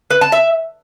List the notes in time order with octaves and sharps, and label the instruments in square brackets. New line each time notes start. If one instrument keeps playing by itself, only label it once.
[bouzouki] B4
A5
E5